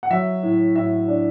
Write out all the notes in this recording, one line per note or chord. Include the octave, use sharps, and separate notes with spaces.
F#5
F#3 E5
A2
A2 E5
D4